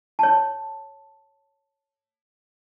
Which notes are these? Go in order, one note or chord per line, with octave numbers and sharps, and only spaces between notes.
C#5 A5